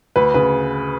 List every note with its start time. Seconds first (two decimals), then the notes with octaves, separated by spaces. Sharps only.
0.16 D2 B4
0.34 C#3 B4